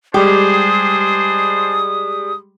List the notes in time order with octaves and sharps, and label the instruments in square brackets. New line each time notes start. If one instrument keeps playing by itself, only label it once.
[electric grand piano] G3 G#3 [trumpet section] D4 G#4 C5 [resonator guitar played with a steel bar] G4 [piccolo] D#6